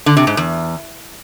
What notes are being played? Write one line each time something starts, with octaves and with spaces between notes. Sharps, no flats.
D3
C3
G#2
E2